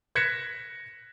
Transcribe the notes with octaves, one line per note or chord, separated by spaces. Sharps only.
F#6 G#6 A#6 B6 C#7 E7